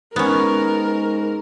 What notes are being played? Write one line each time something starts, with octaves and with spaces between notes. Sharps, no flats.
G#2 B3 C#4 A#4